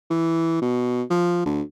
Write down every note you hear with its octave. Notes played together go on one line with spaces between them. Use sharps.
E3
B2
F3
D2